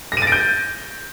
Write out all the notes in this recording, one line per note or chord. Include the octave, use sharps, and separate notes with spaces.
A#6
D#7
A6
D7
G6